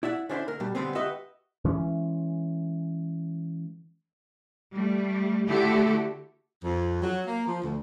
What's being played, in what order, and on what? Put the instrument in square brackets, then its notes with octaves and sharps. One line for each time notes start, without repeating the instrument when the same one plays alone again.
[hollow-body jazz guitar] E4 D5 E5 F#5
D3 C#4 D4 E4 C5 E5
D3 A#4
B2 G3
D3 D#3 G3 G#3 B3 C4
F#4 G4 B4 D#5 E5 F#5
[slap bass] E3 G#3 C#4
[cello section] G3 A3
D3 A3 E4 F#4 G4 A4
[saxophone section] F2
F#3
A#3
F3
D2